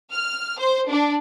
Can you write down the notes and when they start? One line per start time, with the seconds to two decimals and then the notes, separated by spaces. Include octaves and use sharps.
0.10 F6
0.58 C5
0.88 D4